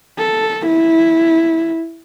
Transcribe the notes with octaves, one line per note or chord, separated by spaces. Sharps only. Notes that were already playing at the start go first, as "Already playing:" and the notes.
A4
E4